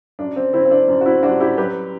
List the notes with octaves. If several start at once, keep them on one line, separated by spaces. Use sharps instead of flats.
F#2 D4
C4
D3 C4 E4
C4
D4
F#2
F#4
C4 E4
G3 D4 F#4
E4 G4
F#3 G4 B4